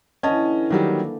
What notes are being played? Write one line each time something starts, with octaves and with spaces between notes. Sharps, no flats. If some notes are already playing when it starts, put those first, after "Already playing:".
D3 E3 C#4 D#5 A5
D#3 F#3 G3 A#3